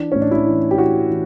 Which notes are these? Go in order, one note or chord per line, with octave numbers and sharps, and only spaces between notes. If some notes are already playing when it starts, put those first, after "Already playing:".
Already playing: E3 D4
A2 C#4
D4
E4
E3
G4
E3 F#4
E3